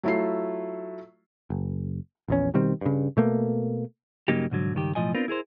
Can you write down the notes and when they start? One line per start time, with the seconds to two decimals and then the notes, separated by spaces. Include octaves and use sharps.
0.03 F#3 A3 E4 F4 C7
1.50 F#1
2.28 A#1 E2 C#4
2.54 B2 D#3 G3 C4
2.81 G2 C#3
3.17 B2 A3 A#3
4.28 G2 C#3 F#3 A#3 D#4 G4
4.50 C2 G#2 D3 F#3
4.74 C#2 G2 D#3 G4
4.95 B1 A2 C3 F3 D#5 G#5
5.15 B3 C4 D4 F4 A#4 B4
5.28 E4 G#4 A#4 C5